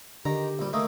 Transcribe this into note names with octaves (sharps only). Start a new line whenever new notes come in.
D3 D#3 G4 A#5
A#1 G3
D#3 A3 A#3 D#6